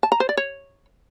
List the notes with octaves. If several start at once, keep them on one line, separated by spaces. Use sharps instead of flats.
A5
A#5
C5
D5
C#5